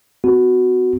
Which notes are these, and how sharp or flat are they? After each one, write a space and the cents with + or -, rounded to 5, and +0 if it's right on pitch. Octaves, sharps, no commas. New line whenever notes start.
B3 +40 F#4 +0